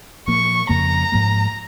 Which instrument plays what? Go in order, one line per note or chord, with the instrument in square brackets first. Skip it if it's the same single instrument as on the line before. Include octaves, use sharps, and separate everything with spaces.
[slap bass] A#2 F3 A#3 [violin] C#6
[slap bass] F2 C#3 F3 A#3 [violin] A#5
[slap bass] G#2 F3 A#3